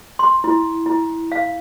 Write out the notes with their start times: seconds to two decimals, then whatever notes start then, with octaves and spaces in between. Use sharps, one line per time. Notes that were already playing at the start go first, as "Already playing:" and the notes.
0.19 C6
0.44 E4
0.86 E4
1.32 F5